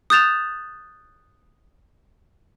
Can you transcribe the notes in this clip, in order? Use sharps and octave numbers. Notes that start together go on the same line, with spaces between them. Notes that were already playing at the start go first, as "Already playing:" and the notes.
D#6 F#6 G6 A6 E7 F7